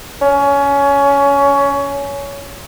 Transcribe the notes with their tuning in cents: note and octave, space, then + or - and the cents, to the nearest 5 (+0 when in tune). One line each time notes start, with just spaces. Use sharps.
C#4 +20